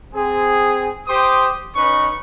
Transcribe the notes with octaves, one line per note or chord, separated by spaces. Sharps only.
C4 G#4
G4 C5 C6 D6 D#6
C#4 D#4 B4 C#6